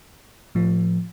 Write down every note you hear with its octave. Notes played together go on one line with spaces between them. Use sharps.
A2 F3